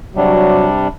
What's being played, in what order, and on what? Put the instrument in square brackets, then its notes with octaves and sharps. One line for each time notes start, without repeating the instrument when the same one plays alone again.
[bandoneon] C3 G3 D4 [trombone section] F#3